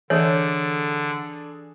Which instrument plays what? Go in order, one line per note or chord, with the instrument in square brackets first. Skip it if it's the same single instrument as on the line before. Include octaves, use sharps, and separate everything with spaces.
[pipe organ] D3 [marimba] E3 [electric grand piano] D4 G#4 A4 [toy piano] C#5